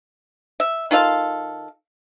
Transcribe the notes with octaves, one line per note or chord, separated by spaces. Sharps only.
E5
D#3 F4 A4 F5